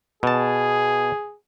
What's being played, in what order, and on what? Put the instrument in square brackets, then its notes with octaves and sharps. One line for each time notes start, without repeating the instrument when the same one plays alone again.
[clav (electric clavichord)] B2 A5 [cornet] G#4